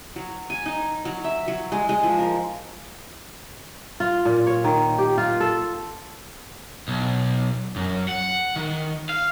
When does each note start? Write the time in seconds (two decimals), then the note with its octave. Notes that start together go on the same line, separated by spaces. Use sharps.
0.16 F#3
0.50 G#5
0.66 D#4
1.05 F#3
1.24 E5
1.48 F#3
1.72 G#3
1.89 G#3
2.03 F3
2.18 A#4
4.00 F4
4.25 A#2
4.47 C#5
4.64 D#3
4.98 G4
5.18 F4
5.40 A4
6.88 B1
7.76 F#2
8.09 F#5
8.56 D#3
9.09 F5